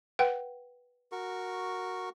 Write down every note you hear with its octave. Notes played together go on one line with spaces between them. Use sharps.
B4 F#5 G5
F#4 A#4 C#6